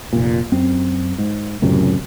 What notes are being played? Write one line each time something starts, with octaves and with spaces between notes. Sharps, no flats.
F1 A#2
F#2 C4
G#2
C#2 F#2 A2 C3